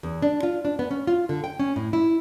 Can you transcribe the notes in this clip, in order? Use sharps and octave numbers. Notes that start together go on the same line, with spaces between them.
E2
D4
F4
D4
B3
C#4
F4
D3
G5
C#4
A2
E4